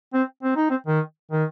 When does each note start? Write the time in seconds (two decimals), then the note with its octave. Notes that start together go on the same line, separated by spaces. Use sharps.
0.14 C4
0.43 C4
0.56 D#4
0.70 C4
0.87 D#3
1.31 D#3